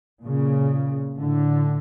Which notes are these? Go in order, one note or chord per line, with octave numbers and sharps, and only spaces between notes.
A#2 C#3
A2 D3